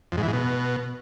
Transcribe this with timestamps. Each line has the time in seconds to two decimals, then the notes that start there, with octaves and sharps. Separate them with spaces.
0.12 F2
0.17 G#2
0.23 E3
0.28 G#2
0.33 B2